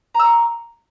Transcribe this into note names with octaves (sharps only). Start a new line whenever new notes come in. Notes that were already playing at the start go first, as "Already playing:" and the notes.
A#5 C#6 E6